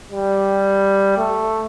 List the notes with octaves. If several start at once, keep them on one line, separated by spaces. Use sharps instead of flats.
G3
A3